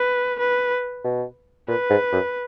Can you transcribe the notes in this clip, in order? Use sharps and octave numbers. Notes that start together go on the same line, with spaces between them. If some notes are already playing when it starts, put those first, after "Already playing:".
Already playing: B4
B4
B2
A#2 B4
G#2
F#2